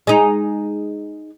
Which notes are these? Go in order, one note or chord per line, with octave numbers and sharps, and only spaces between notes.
G#3 D#4